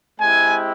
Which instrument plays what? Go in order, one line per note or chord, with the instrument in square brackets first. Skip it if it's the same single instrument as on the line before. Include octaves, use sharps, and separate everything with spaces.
[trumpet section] G#3 C4 E4 G4 G#5